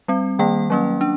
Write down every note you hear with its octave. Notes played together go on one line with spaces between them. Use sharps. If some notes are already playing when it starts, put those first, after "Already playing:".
G3 C4
D#3 G3 A#3 G5
F#3 A#3 C#4
D4